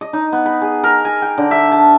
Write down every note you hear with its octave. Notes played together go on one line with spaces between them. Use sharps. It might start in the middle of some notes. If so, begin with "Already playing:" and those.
D#5
D#4
B3
B5
G#4
A#4
G#5
G5
D3
E5
A5